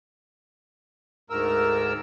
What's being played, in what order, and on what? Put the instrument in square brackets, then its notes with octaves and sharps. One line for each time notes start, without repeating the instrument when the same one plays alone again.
[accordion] D2 G#2 A#4 E6